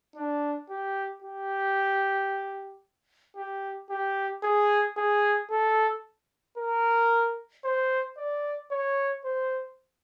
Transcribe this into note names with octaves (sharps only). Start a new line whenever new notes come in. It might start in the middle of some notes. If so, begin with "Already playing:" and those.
D4
G4
G4
G4
G4
G#4
G#4
A4
A#4
C5
D5
C#5
C5